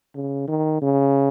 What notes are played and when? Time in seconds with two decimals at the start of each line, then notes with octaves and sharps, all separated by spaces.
0.15 C#3
0.48 D#3
0.82 C#3